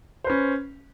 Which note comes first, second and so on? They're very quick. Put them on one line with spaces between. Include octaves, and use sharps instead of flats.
C5 B4 C#4